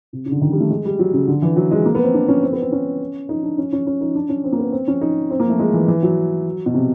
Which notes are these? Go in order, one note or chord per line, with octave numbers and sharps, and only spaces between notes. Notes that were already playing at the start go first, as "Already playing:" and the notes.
C3
C#3
D3
D#3
G3
A3
G#3
G3
F#3
C#3
D3
E3
F#3
G#3
A#3
B3
C4
D4
C#4
C4
B3
C4
C#4
D#4
D4
C#4
C#4
C#4
D#4
D4
C#4
C4
A#3
B3
C4
C#4
D#4
C4
A#3
A3
G#3
E3
E3
F#3
B2
C3